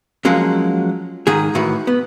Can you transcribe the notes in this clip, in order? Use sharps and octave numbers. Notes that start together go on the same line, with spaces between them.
F3 F#3 G#3 A#3 C#4
G#2 D#3 G#4
A2 D#3 E3 F#4
B3